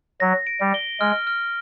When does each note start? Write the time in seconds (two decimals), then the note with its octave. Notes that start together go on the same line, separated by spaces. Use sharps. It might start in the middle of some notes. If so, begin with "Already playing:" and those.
0.20 F#3 A#6
0.47 D7
0.61 G3
0.74 G7
1.00 G#3 F6
1.27 F6